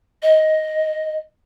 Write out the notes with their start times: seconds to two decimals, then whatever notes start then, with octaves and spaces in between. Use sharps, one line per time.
0.23 D#5